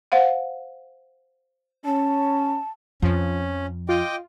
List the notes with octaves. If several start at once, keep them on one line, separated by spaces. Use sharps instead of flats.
C5 F5 F#5
C#4 A5
F2 F3 C#4
F4 D#5 G5 D6